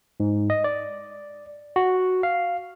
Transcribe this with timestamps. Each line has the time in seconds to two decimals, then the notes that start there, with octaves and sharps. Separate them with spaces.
0.20 G#2
0.50 D#5
0.64 D5
1.76 F#4
2.23 F5